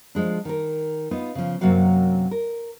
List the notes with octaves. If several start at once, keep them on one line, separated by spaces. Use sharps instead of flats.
F3 G#3 D4
D#3 A#4
B3 D#4 F4
C#3 F3
F#2 C3 F#3 A#3 F#4 F5
A#4